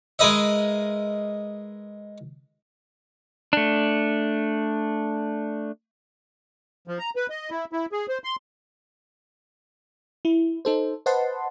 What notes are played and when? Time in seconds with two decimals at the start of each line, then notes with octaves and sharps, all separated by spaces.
0.19 G#3 A#4 B4 D#5 E5
3.53 A3 D4
6.88 F3
6.99 A#5
7.16 B4
7.30 D#5
7.51 E4
7.72 E4
7.92 G#4
8.09 C5
8.24 C6
10.25 E4
10.65 D#4 A4 C5
11.06 B4 C5 D#5 F#5 A5 C6